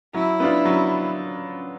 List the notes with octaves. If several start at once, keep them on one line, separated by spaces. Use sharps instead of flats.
F#3 E4
B3 D4 F4
F#3